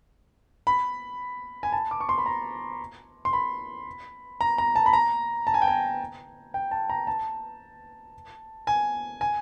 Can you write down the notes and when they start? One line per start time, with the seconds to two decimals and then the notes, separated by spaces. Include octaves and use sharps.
0.67 B5
1.63 G#5
1.72 A5
1.91 D6
2.01 C#6
2.09 C6
2.18 B5
2.26 A#5
3.25 C6
3.33 B5
4.41 A#5
4.58 A#5
4.76 A5
4.86 B5
4.93 A#5
5.47 A5
5.54 G#5
5.62 G5
5.68 G#5
6.54 G5
6.71 A5
6.90 A#5
7.07 A5
8.67 G#5
9.21 G#5